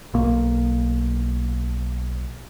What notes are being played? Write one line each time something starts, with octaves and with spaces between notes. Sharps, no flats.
B1 A#3